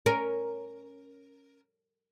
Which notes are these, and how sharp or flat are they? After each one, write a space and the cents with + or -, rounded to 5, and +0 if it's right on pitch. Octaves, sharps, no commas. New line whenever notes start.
C#4 +0 A#4 +0